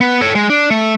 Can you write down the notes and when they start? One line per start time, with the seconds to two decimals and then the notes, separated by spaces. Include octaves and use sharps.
0.01 B3
0.21 A4 C#5
0.35 G#3
0.50 D4
0.70 A3